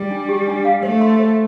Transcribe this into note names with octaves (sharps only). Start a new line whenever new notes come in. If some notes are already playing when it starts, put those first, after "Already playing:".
Already playing: G3
D4
G4
D4
F5
A3 C5
C6
C5